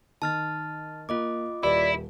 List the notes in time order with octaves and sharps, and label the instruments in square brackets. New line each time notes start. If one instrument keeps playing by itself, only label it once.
[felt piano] D#3 [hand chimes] A5 F6 A6
[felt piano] A#3 [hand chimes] F4 D#5 D6
[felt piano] D#1 G4 B4 [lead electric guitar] E4 [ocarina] D5